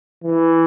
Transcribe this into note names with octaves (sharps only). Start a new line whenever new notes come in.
E3